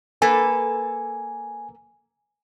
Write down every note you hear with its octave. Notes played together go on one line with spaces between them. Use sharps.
A#3 A4 B4 G#5